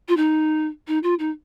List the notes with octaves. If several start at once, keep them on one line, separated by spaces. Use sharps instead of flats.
F4
D#4
D#4
F4
D#4